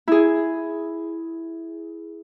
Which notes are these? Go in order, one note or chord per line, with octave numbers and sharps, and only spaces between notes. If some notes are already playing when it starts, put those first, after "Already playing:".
E4 G#4